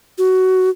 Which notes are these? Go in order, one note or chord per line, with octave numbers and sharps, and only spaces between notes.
F#4